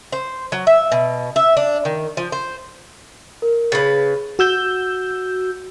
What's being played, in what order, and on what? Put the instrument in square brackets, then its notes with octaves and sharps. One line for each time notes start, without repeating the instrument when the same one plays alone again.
[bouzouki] C5
F#3
E5
B2
E5
D4
D#3
F3
C5
[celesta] A#4
[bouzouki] C#3 B4 [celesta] A6
[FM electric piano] F#4 E6 G6